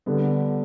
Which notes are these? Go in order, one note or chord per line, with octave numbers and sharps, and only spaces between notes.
D3 G3 B3